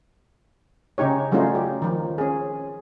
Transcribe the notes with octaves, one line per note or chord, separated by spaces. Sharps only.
C#3 C#4 D#4 G4 C#5
F#3 G3 A3 C#4 D#4 F4
G4
D#3 F3
C#4 G#4